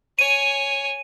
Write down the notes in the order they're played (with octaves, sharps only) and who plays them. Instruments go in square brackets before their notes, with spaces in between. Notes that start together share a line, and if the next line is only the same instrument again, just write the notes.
[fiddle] C#5 G#5 [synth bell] D#7